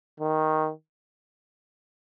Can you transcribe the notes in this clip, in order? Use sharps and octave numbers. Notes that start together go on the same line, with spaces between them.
D#3